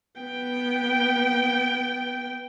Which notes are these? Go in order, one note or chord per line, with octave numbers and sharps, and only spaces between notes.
B3 G5